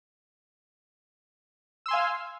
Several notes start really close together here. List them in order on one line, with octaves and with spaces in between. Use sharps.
E6 C6 G#5 F5